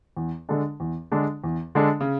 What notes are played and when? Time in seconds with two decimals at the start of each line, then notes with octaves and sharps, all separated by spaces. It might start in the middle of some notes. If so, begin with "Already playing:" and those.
0.17 E2
0.49 D3 G#3 D4 A4
0.80 E2
1.12 D3 G#3 D4 A4
1.44 E2
1.75 D3 G#3 D4 A4
2.00 C#3